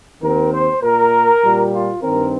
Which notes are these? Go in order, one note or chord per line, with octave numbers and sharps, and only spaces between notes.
D#2 D#3 C4 A#4
C5
A#2 A#3 A#4
A#2 G3 A#3
F4
G2 D#3 C4 A#4